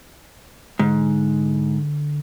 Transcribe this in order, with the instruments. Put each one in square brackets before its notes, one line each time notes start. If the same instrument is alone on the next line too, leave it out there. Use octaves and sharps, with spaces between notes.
[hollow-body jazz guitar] G#2 [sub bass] D3